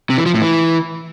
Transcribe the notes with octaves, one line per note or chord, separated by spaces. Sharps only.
C3
E3
F3
A2
E3